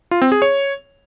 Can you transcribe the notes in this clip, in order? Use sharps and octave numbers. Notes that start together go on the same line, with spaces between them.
F4
C4
G#4
C#5